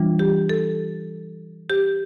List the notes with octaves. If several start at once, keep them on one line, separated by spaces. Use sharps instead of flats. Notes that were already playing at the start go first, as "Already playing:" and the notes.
Already playing: E3 G3 D4 F4
G4
A4
G4